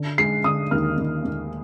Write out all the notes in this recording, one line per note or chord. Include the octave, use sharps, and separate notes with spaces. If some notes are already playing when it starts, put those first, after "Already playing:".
Already playing: D3
G#3 C7
D3 D#6
D#2 F6
D#2
D#2